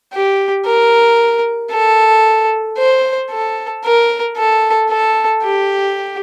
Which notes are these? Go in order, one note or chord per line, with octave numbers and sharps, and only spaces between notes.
G4
A#4
A4
C5
A4
A#4
A4
A4
G4